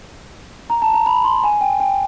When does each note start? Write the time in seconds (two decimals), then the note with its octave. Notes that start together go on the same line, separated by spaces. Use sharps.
0.70 A#5
0.82 A5
0.94 A#5
1.06 B5
1.24 C6
1.44 G#5
1.61 G5
1.80 G5